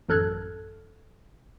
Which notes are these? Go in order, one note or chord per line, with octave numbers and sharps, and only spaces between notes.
A1 F#2 A4 F6 F#6 G#6